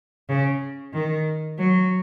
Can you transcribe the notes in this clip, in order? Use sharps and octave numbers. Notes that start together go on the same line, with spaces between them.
C#3
D#3
F#3